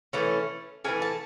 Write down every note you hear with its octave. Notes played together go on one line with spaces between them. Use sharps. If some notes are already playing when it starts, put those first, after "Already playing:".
E3 A3 C#4
E3 A3 C#4 G#5
A5